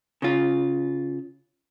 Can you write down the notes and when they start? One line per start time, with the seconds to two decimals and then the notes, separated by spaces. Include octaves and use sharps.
0.22 C#3 F4